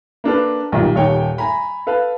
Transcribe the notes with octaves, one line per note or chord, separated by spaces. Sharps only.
A#3 D4 A4 B4
B1 A#2 D#3 G3
D#1 D#2 C#5 G5
G#5 A#5 B5
A4 B4 F5